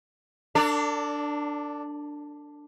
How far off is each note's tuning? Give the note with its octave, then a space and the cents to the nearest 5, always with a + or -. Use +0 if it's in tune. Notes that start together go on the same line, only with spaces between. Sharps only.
D4 +0 A4 +45 D5 -25